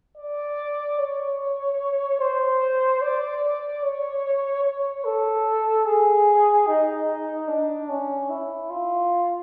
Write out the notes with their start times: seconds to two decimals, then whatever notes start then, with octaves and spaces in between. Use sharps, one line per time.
0.18 D5
0.99 C#5
2.20 C5
3.02 D5
3.83 C#5
4.65 C#5
5.05 A4
5.86 G#4
6.67 D#4
7.48 D4
7.89 C#4
8.30 E4
8.70 F4